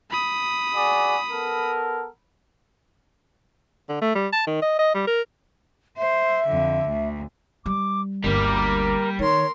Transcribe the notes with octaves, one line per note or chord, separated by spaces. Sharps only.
B5 D#6
F#4 G#4 D5
B3 A4 A#4
D3
A3
G3
A5
D#3
D#5
D#5
G3
A#4
C5 E5
F2 D3
D2
G3 D6
G1 D2 G3 A#3 A#4 D6
D#3 A#4 C#5 C6